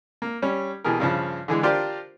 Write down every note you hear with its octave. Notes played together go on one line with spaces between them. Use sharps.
A#3
G3 C#4
B2 E3 G4 G#4 A#4
G2 C#3 F3
D3 E3 G#3
D4 F4 G4 A#4 C5 D5